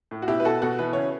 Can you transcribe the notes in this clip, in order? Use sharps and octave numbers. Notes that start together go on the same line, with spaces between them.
A2
F#4
B2 E4 G4
B4
B2 F#4 A4
B2 F#4 A4
E3 B4
C#3 C#5